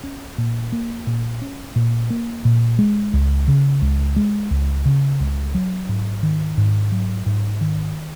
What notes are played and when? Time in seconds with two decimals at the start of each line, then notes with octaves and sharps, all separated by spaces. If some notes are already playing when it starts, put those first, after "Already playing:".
0.04 C#4
0.38 A#2
0.72 A#3
1.07 A#2
1.42 C#4
1.76 A#2
2.10 A#3
2.45 A#2
2.79 G#3
3.13 C#2
3.48 C#3
3.82 C#2
4.16 G#3
4.51 C#2
4.85 C#3
5.20 C#2
5.54 F#3
5.89 G#2
6.23 D#3
6.57 G#2
6.92 F#3
7.26 G#2
7.61 D#3